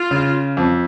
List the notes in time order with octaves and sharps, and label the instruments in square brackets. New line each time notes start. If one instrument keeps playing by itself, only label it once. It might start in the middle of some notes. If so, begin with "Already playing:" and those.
Already playing: [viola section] F4
[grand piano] C#3
F2